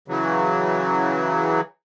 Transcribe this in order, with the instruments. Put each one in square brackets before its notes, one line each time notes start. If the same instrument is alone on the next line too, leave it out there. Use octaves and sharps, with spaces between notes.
[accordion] C#3 E3 F#3